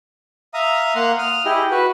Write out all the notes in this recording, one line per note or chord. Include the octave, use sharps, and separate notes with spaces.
E5 F5 A#5 D#6
A#3 F5 F#5 C6
D#6 F6
E4 G4 G#4 D#5
F#4 B4